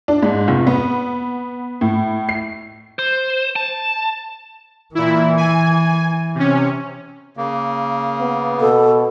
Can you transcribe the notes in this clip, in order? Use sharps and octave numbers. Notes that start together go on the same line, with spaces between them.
D4
G#2
F1
B3
A2
C7
C5
A5
A#2 E3 E4
G#5
C3 C#4
C#3 A#3
B3
B2 A4